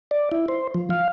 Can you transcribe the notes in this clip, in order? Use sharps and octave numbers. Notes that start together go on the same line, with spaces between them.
D5
E4
C5
F3
F5